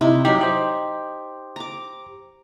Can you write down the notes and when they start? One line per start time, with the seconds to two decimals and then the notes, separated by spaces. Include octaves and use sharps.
0.01 C3 D#4 E4
0.25 F#3 D#4 G4
0.41 G4 C5
1.56 A#5 D6